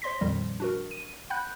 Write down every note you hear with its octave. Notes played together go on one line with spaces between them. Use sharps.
C5 C#5 C6 A#6 B6
F2 A#2 D#3 F3 G3
D4 F#4 A#4
D#7
F#5 G5 B5 F#6 G6